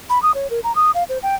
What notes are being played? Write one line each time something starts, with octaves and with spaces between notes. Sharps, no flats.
B5
D#6
C#5
A#4
A#5
D#6
F5
C5
G5